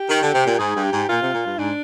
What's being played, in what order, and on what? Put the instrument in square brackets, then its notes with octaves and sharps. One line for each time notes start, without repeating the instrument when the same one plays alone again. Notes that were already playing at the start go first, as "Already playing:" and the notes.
Already playing: [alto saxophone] G4
[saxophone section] D#3
D3
C3
A#2
[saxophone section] G#2 [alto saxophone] G#4
[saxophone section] G2
[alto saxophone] G4
[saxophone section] G#2
[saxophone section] A#2 [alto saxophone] F4
[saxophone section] C3
A#2
G2
[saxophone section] G#2 [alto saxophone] D4